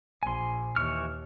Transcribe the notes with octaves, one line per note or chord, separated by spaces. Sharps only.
A#1 A#2 G#5 C6
D#2 E3 C#6 F6